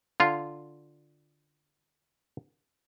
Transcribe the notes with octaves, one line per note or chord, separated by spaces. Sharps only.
D3 F4 F5